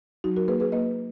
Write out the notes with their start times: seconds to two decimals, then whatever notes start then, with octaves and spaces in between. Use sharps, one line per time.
0.24 F#3 D#4 F#4
0.36 F#4 A#4
0.48 A#3 G#4 B4
0.60 G#4 B4
0.72 A#3 B4 D#5